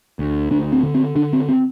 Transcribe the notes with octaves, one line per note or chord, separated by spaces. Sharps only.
D2
D2 D4
C4
D3
C4
D3 D4
C4
C4